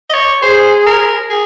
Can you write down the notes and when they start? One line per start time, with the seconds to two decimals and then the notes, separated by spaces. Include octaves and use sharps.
0.09 D#5
0.13 C#5
0.42 G#4 C5
0.86 A#4
1.30 G#4